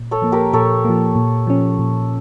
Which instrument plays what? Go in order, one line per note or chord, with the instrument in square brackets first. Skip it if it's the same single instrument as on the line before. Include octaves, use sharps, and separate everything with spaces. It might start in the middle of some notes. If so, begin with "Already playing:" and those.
Already playing: [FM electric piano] A#2
[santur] A4 C#5
[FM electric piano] F3 A#3
[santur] G4 A#4
[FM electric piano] A#2 [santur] A4 C#5
[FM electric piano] F3 A#3
A#2
F3 C#4
A#2